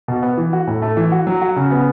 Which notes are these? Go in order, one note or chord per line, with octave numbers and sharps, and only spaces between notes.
B2
B3
E3
F#4
A2
A3
E3
F#4
F#3
F#4
C#3
B3